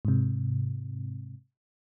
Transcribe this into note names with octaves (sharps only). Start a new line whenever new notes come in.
G#2 C3